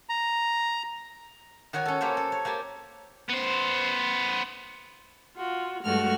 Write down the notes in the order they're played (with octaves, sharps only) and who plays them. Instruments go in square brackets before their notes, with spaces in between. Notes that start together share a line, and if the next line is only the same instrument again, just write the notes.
[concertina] A#5
[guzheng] D#3 F#4 C#5 D#5 G#5
C#4 A4
A#3 G4 A4 C5 C#5
A4
C#5
A#3 G4 G#5 A5
[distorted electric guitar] B3 C5
[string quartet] F4 F#4
G2 G#3 A3 F#4 F6